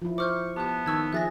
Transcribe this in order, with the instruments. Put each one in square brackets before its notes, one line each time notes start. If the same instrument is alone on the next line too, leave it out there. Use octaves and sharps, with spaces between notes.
[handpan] F3 E4
[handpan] C5 [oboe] C#6 [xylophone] D6 F6 G6
[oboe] B3 [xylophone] G4 F#6 [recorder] A5
[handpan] D#3 [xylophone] C#6 E6 G#6
[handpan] F3 G#4 [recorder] E5 [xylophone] F#6 A6 A#6